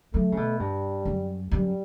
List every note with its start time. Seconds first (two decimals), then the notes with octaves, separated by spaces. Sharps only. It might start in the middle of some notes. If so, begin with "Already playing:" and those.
0.14 F#3 A3
0.32 C#3
0.37 B2
0.60 G2 G3
1.05 F#2
1.51 F#2 G3